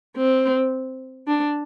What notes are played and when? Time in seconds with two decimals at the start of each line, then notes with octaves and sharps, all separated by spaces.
0.17 C4
1.27 D4